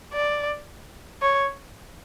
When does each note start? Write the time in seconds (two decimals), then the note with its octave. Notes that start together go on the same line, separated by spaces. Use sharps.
0.13 D5
1.22 C#5